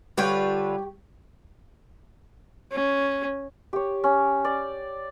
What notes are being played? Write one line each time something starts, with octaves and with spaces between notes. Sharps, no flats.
D3 G3 F4 G4 B4 C#5 G5
C#4
G4 C#5
C#4
D5